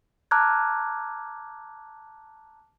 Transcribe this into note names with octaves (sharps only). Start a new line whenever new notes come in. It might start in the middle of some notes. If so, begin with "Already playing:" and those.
A5 A#5 D6 F6 F#6 G#6